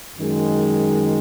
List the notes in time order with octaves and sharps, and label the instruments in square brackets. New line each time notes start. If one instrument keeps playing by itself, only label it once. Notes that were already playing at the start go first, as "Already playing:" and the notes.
[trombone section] F#2 D#3 G#3